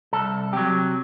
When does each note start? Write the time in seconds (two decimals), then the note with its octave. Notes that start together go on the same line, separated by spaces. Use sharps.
0.13 C2 A4
0.53 C3 F#3 G4